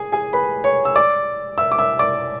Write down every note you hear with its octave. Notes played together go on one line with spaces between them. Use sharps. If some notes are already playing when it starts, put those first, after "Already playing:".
Already playing: G#4 G#5
G#4 G#5
B4 B5
C#5 C#6
E6
D5 D6
E5 E6
D6
E5 E6
D5 D6